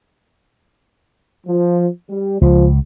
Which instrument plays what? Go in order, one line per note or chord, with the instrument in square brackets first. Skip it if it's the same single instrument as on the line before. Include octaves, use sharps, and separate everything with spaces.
[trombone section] F3
G3
[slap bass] C#2 [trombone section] F3